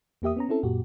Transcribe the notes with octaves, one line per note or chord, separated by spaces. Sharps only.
E2 A#3 G4 E5 D#6
B3 C#4 A#5
C4 C#4 E4 A4
F#2 A#2 F#4 G4